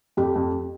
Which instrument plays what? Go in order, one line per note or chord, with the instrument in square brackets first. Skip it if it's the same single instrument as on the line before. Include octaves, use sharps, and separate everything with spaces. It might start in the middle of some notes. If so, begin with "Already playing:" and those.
[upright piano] F2 [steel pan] G4
[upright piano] F2